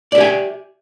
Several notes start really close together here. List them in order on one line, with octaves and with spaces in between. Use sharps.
D5 E5 G4 G#5